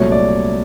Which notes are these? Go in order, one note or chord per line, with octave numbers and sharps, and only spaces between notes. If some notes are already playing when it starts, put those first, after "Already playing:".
Already playing: C2 A#2 F#3 A3 C#5
D5